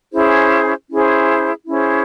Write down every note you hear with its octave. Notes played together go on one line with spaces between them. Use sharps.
C#4 E4 G#4 C5
C#4 E4 G#4 C5
C#4 E4 G#4 C5